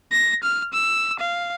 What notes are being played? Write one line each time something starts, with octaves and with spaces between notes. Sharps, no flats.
A#6
F6
E6
F5